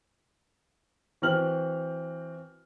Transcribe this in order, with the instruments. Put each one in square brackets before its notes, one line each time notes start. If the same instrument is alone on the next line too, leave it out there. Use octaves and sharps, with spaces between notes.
[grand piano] E3 C4 F#4 G5 F6 F#7